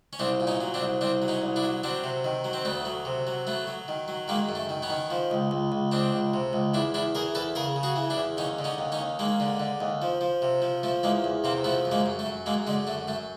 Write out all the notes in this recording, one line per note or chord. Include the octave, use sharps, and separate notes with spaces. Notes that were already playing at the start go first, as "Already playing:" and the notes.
C#4
C2 C4 D4
A#2
C#4 D#4
F#3
C4 D4
C2
C2 C4 D4
F#3
C#4 D#4
C2
D4 E4
F#3
F#3 C4 D4
C3
D#3
F#3
C4
D2 A3 B3
F#3
C3
F#3
F#3 A3 B3
F#3
D#3
F#3
D#3 G#3 A#3
F#2
A3
D#3
B3 C#4
D#3
F3
C#2
C#2
C#2
C#2 C4 D4
C#2
C3
C#2
E2 D4 E4
E2 D4 E4
E3 G#4 A#4
E2 A4 B4
C#3 G#4 A#4
C#3
F#4 G#4
E3
D4 E4
E2
D#2 C#4 D#4
D3
C#4 D#4
D#2
C#4 D#4
D#2
D#2 G#3 A#3
D3
D3
D#2
F3
F3
C3
F3
F3 A3
E2 G#3 A#3
E2
C3 A#3 C4
F3 A3 B3
F#2
G#3 A#3
F#2
A3
F#2
F#2 G#3 A#3
D3 G#3
F#2 A3
F#2 A3